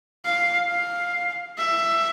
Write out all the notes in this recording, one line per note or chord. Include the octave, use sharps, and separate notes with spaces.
F5
F5
E5